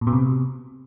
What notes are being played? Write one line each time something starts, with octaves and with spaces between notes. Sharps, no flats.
A#2
B2
C3